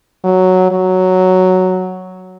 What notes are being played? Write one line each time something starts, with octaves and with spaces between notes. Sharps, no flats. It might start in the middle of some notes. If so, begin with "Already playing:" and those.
F#3
F#3